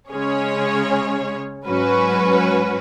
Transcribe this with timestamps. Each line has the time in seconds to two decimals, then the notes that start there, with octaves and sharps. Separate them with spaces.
0.10 C#3 G#3 C#4 G#4 C#5
1.66 G#2 F#3 C#4 F#4 B4